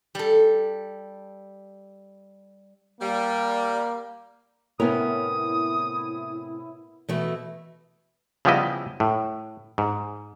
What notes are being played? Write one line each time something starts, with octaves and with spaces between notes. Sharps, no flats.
G3 A4
G3 A#3
A2 C3 B3 C#4 E4 A#4 D#6
B2 E3 A3 F#4
C#3 F3 G3 B3 E4 D#5
A2
G#2